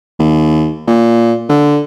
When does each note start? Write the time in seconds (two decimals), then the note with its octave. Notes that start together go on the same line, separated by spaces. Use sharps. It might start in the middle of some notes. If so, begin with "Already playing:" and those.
0.19 D#2
0.87 A#2
1.49 D3